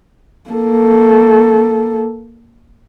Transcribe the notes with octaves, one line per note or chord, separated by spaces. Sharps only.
A#3 A4